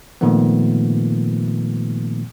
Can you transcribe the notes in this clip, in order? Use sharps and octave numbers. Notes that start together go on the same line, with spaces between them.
A#2 D#3 F3 A3 B3